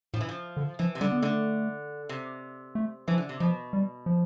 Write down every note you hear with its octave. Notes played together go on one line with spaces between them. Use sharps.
A2 F3
E3
F3
D3
E3 F3
C3
D3 G3
B3
D3 A3
C3
A3
E3 F3
D3
C3
B2 F3
G3
F3